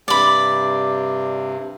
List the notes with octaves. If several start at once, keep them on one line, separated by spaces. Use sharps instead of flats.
G2 C3 D5 B5